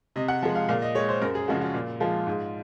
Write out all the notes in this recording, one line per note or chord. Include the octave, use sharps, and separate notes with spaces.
C3 D#5
F#5
F3 G#3
F5
A#2 F5
D#5
G#3 C#5
C5
F#2 A#4
G#4
C#3 F3 G#3 F#4
F4
A#2
F3 G#3 F4
G#2